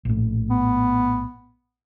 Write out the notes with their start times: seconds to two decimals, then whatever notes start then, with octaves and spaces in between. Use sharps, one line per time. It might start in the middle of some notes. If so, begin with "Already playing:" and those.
0.05 A#1 A2
0.50 B3